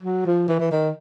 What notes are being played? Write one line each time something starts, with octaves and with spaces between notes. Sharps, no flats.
F#3
F3
E3
E3
D#3